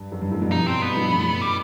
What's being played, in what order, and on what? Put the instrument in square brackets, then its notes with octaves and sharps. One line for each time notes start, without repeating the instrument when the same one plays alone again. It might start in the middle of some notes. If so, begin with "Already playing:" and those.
Already playing: [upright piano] G2
F#2
G2
F#2 A2
G2 B2
[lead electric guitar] D#4
C4
B3
[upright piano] G2 B2
F#2 A2
[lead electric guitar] G3